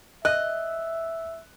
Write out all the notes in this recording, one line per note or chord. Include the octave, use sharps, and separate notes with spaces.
D#5 E5 F#6